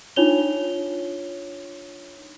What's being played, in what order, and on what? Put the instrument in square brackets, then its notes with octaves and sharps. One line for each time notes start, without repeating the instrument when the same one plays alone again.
[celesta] D4 D#4 F4 C#5 F7 G7